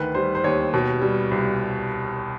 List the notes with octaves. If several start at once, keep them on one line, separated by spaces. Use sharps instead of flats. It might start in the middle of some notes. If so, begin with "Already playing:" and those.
Already playing: D2 D#3 B4
G3 C5
C5
D#2 C#5
B2
G3
C2